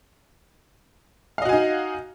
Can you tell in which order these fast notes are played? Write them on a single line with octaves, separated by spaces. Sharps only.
F5 D#5 F#4 G#5 D#4